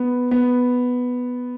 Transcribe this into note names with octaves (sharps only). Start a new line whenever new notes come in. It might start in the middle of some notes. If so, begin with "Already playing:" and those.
Already playing: B3
B3